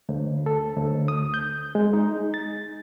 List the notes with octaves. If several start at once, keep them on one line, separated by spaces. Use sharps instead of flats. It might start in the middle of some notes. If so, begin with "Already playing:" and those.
D2
A4
D2
D#6
G6
G#3
D#4
A6